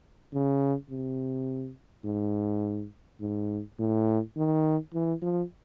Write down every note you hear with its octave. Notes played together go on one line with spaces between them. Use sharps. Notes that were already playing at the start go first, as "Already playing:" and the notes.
C#3
C3
G#2
G#2
A2
D#3
E3
F3